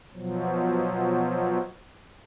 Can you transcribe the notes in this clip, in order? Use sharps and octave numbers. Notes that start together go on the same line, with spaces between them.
B2 F3 F#3